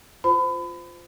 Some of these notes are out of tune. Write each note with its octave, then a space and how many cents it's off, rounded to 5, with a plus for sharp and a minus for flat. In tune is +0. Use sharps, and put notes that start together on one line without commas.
F4 +0 C5 -25 B5 +30